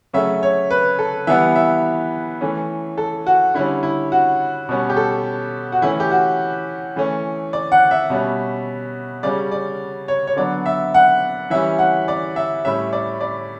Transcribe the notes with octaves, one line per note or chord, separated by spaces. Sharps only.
C#3 F#3 A3 C#4 E5
C#5
B4
A4
E3 G3 B3 E5
E5
E3 A3 C#4
A4
F#4
D3 G3 C#4 E4
E4
F#4
B2 G3 C#4
G4
A4
F#4
E3 A3 C#4 E4
G4
F#4
E3 A3 C#4
D5
F#5
E5
B2 G3 C#4
C#3 G3 C#4 D5
D5
C#5
C#5
D3 F#3 B3 D5
E5
F#5
E3 G3 C#4 E5
F#5
D5
E5
A2 G3 C#4 E5
D5
D5